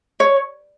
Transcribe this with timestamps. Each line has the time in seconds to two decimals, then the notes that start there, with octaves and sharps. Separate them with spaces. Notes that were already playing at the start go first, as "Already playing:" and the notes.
0.20 C#5